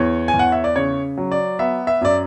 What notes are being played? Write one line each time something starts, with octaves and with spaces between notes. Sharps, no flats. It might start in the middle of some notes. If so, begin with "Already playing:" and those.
Already playing: E2 C#5
G#5
E2
F#5
E5
D5
C#3 C#5
F#3
D5
B3 E5
E5
F#2 D5